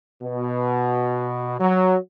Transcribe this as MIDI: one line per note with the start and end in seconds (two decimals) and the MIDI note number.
0.22 1.57 47
1.60 1.97 54